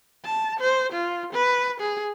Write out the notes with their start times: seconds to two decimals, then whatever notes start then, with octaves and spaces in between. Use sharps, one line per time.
0.25 A5
0.60 C5
0.92 F4
1.33 B4
1.80 G#4